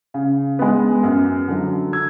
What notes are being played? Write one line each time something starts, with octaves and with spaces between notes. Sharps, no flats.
C#3
G#3 B3
F#2
D3 F#3
E6 G#6